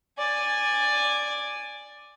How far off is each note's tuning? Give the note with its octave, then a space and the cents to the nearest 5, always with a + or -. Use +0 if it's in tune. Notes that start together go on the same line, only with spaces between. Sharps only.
D5 +5 G#5 -10